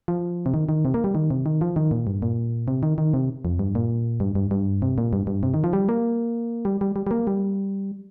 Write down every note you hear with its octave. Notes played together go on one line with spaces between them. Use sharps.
F3
C3
D#3
D#3
C3
A#3
G3
D#3
C3
D#3
F3
D#3
A#2
G2
A#2
C3
D#3
D#3
C3
F2
G2
A#2
G2
G2
G2
C3
A#2
G2
G2
C3
D#3
F3
G3
A#3
G3
G3
G3
G3
A#3
G3